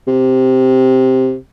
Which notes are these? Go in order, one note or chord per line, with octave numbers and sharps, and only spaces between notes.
C3